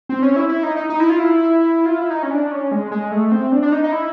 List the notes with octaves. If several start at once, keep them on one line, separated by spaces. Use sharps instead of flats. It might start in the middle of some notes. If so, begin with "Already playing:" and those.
C4
C#4
E4
E4
D#4
D#4
D#4
E4
F4
E4
F4
E4
D#4
C#4
D4
C#4
G#3
G#3
A3
C4
D4
D4
D#4
D#4
E4